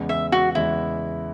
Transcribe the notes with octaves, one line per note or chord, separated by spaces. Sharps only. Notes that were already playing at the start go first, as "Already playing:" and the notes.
Already playing: E2 C#3 G#3 B3
E5
F#4
E2 C#3 G#3 B3 E4